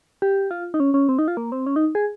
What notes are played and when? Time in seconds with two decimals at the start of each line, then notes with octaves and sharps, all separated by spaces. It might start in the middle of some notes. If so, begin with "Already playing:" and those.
0.22 G4
0.51 F4
0.74 D#4
0.80 C#4
0.94 C#4
1.09 C4
1.19 D#4
1.28 F4
1.37 A#3
1.52 C4
1.66 C#4
1.76 D#4
1.95 G#4